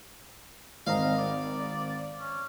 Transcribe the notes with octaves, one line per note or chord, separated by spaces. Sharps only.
G#1 C4 D#5 F5 A#5
D5
C#4